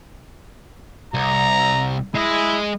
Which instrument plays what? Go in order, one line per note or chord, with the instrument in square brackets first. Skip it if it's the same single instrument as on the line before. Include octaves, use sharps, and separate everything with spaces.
[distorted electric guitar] C2 [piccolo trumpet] A#5
[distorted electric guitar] G#3 D#5 [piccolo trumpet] E4